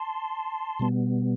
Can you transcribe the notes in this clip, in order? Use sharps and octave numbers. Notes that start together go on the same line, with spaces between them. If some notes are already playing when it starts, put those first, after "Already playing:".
Already playing: A5 C6
B2 G3 B3